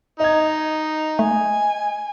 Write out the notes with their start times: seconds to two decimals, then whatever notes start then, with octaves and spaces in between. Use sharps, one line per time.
0.20 D#4 D#5 G#6
1.19 A3 G#5